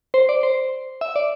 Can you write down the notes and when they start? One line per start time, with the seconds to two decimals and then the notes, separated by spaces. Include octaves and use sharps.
0.14 C5
0.29 D5
0.43 C5
1.01 E5
1.16 D5